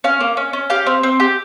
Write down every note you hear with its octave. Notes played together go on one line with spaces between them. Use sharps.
C#4 F5
A#3
C#4
C#4
G4 F5
C4
C4
G4